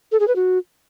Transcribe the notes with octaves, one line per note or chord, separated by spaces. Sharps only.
A4
G#4
B4
F#4